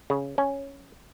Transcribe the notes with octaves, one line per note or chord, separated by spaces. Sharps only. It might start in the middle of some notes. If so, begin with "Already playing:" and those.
C#3
C#4